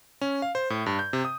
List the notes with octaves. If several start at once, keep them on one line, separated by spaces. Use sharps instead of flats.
C#4
F5
C5
A2
G2
G6
C3
D#6